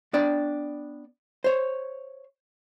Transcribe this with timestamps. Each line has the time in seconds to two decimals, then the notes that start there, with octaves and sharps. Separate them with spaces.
0.13 B3 D4 D5 G5
1.44 C5 C#5